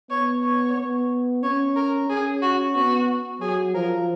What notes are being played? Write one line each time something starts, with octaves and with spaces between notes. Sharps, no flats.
B3 C#5
C#5
B3
C#4 C#5
A#4
C#4 G#4
F#4
B3 F#4
F#3 G#4
F3 A#4